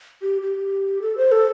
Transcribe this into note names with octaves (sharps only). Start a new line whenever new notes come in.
G4
G4
A4
C5
A4